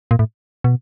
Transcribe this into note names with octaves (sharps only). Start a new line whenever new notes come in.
A#2
A2
B2